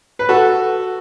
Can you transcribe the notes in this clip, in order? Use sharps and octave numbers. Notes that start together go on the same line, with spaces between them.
B4
F#4 A4